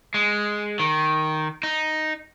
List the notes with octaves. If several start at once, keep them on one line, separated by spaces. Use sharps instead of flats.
G#3
D#3
D#4